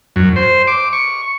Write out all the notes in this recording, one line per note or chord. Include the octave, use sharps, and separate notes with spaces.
F#2
C5
D6
C#6